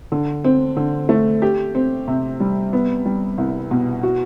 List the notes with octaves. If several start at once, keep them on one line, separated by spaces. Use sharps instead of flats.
D3
C4
D3
A3
G4
C4
C3
G3
B3
G3
C2
B2
F#4